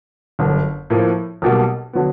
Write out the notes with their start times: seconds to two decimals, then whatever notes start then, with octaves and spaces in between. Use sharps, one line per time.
0.39 G1 F#2 D3
0.90 A2 F3 A#3
1.42 B1 B2 G3 A#3
1.93 D3 F#3 B3